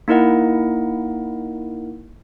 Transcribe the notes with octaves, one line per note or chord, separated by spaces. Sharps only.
A#3 D#4 E4 A#4 D#5 F#5